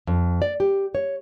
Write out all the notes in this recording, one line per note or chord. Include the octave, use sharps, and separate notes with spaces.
F2
D5
G4
C#5